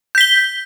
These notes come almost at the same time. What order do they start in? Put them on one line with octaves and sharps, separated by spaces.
G6 B6 G7